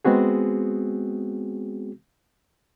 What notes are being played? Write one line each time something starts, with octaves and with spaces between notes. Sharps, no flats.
G#3 B3 C4 F#4 G#4